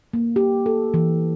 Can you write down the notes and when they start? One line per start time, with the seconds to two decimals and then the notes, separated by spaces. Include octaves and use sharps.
0.13 A#3
0.36 G4
0.66 A4
0.94 E3